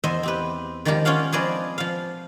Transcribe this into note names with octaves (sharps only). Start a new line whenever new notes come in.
E2 C5 D#5 E5 C6
C4 G4 B4
D#3 F3 G3 G#3 G4 A#4
C#4 F4 D5 F5 F#5
F3 C4 G#4 B4 D5 D#5
F3 F5